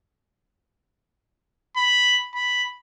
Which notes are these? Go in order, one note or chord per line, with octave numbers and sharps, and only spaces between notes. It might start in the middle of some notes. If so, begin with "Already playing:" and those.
B5
B5